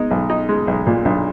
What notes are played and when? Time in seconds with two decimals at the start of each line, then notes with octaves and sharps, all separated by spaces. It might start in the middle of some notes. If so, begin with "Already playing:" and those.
Already playing: G#3 B3 D#4
0.11 B1
0.30 D#4
0.49 G#3
0.67 B1
0.87 A#2
1.05 B1 D4